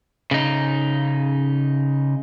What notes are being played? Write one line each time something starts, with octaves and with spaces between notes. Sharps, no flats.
C#3 D#4